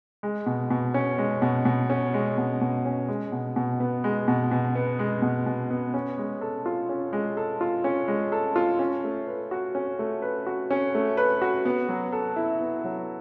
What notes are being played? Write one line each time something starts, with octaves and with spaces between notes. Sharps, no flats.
G#3
B2
B2
C#4
G#3
B2
B2
C#4
G#3
B2
B2
C#4
G#3
B2
B2
B3
G#3
B2
B2
B3
G#3
B2
B2
B3
C#4
G#3
A4
F4
C#4
G#3
A4
F4
C#4
G#3
A4
F4
C#4
A3
B4
F#4
C#4
A3
B4
F#4
C#4
A3
B4
F#4
B3
F#3
A4
E4
B3
F#3